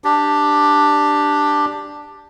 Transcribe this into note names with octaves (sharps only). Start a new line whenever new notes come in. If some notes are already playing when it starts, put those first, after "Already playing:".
D4 G4